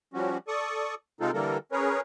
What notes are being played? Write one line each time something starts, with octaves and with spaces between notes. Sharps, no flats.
F3 G3 C#4 F#4
A4 D5 C#6 D#6
C3 G#3 C4 D#4 F4 A4
D3 E3 G3 A#3 A4 A#4
C#4 G#4 A#4 B4 C#5